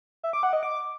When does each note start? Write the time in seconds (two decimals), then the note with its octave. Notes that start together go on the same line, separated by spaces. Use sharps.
0.24 E5
0.33 D6
0.43 F#5
0.53 D#5
0.63 D6